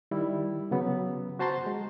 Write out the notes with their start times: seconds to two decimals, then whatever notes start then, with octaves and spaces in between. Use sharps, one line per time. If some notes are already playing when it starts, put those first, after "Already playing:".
0.11 D#3 G3 E4
0.71 C#3 F#3 B3
1.39 F#4 C5 A5 A#5 C6
1.66 G#3